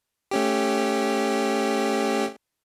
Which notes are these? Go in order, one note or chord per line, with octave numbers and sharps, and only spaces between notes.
A3 C#4 G4